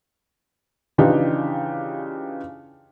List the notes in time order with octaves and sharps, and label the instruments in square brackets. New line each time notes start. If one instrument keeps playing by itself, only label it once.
[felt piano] C#3 E3 D4 D#4 F4 G4